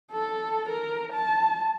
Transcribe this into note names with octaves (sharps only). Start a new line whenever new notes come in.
A4
A#4
A5